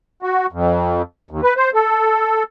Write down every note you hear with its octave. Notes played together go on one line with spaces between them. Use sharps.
F#4
F2
D#2
B4
C5
A4